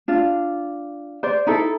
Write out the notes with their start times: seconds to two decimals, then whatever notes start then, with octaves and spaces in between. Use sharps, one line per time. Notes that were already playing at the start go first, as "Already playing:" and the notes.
0.08 D4 F4
1.23 C5 D5
1.47 D#4 E4 A4